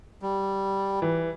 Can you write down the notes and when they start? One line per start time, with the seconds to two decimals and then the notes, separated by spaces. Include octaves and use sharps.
0.22 G3
1.02 E3